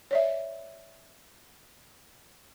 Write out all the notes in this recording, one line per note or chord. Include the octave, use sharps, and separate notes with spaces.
C#5 D5 E5